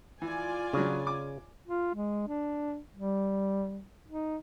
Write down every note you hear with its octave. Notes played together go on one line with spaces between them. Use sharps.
E3 F4 D5 G#5
C#3 F#3 D4
D6
F4
G#3
D4
G3
D#4